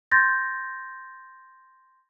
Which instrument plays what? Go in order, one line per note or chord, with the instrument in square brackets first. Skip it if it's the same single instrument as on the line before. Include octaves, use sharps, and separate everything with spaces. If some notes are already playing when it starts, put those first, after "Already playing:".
[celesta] C6 G6 A6 A#6